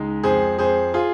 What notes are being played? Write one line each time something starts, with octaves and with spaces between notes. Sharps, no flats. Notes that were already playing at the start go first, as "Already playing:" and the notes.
Already playing: C#2 G#3 D#4
F2 G#4 C5
F2 G#4 C5
F4 G#4